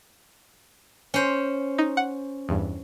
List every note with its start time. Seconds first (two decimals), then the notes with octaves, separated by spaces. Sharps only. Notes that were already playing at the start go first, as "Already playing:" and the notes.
1.14 C#4 C5
1.79 D#4
1.97 F#5
2.49 E2 G2